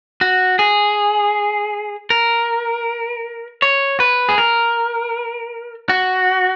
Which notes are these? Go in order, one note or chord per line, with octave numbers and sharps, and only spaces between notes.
F#4
G#4
A#4
C#5
B4
G#4
A#4
F#4